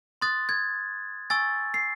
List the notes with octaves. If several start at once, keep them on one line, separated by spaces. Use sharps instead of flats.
C6 D#6 F#6 A6
G#6
G#5 C#6 E6 A6
C7